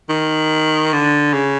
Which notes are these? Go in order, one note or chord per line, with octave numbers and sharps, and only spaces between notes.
D#3
D3
C#3